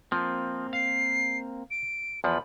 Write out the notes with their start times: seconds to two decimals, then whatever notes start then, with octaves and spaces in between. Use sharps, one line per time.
0.12 F3 A#3 C4
0.73 F5 C7
1.71 D7
2.24 E2 F3 B5